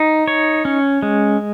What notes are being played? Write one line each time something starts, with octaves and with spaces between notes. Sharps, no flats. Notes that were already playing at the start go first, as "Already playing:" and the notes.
Already playing: D#4
C#5
C#4
G#3